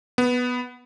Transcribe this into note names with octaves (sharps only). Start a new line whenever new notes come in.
B3